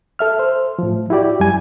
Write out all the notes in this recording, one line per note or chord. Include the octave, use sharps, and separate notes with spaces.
A4 E5 F6
C5
A2 F3
E4 F#4 G4 D5
F#2 G3 G#5